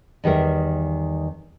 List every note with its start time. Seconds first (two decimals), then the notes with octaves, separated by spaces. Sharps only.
0.24 E2 D#3 G3 A#4 E5